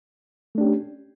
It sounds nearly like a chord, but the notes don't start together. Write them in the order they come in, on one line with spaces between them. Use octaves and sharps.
A3 D4 G4 C#4